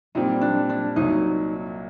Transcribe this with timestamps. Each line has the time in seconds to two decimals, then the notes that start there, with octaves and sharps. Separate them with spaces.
0.15 A#2 G3 C4 D#4
0.41 D4
0.69 D4
0.96 C2 A#2 F#3 D#4